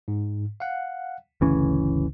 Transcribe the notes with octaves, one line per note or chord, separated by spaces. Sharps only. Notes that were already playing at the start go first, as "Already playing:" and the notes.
G#2
F5 F#5
G1 D2 C#3 E3 C#4